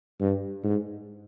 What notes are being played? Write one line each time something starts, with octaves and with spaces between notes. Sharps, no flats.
G2
G#2